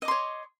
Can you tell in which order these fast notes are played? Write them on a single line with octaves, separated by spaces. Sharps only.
D#5 D6 C6 C#5